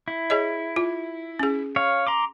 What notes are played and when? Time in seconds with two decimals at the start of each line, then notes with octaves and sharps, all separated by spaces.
0.08 E4
0.30 G#4 C#5 D#5
0.76 F4
1.39 C#4 G#4
1.76 C#5 F5
2.07 A#5 C6 D6